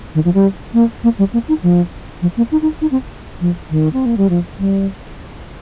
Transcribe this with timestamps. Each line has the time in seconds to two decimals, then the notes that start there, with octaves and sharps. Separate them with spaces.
0.15 D#3
0.25 F3
0.34 G3
0.74 A#3
1.04 A#3
1.19 G3
1.33 A#3
1.48 D#4
1.63 F3
2.22 F3
2.37 A#3
2.52 D#4
2.62 D#4
2.81 D#4
2.91 C4
3.41 F3
3.70 D#3
3.93 C4
4.06 A#3
4.17 G3
4.30 F3
4.59 G3